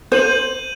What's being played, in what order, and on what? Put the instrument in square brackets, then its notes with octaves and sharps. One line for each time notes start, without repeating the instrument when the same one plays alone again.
[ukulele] C5 [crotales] G6 D#7 F#7